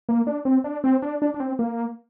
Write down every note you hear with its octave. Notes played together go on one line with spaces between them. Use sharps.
A#3
D4
C4
D4
C4
D4
D4
D4
C4
A#3